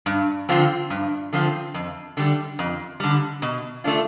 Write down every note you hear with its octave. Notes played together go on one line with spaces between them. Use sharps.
G2
D3 F3 C4 F4
G2
D3 F3 C4 F4
F2
D3 G3
F2
D3 G3
B2
A3 D4 F4